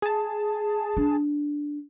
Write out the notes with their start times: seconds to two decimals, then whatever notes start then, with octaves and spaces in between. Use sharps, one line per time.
0.02 G#4 A5
0.97 D4